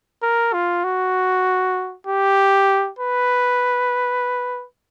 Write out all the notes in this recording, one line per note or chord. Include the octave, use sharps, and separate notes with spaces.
A#4
F4
F#4
G4
B4